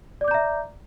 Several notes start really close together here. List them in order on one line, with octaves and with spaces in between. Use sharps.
D5 D6 G6 A#5 E5